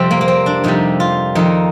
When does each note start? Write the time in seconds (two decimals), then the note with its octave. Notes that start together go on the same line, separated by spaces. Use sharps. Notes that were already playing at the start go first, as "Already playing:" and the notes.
Already playing: F2 C3 G3 C4
0.11 A#3
0.21 A#3
0.28 C4
0.46 D4
0.64 F2 C3 G3 D#4
1.00 F4
1.35 F2 D#3 A#3 D#4